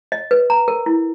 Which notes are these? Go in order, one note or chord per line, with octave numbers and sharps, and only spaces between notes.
D#5
B4
A#5
A#4
E4